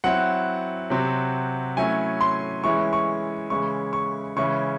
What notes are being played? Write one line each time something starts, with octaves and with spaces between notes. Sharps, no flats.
F#3 C4 E4 F#5
C3 F#3 C4
F#3 A3 C#4 E4 G#5
C6
E3 G#3 C#4 E4 C#6
C#6
C#3 E3 G#3 C#4 E4 C#6
C#6
C#3 E3 G#3 C#4 E4 C#6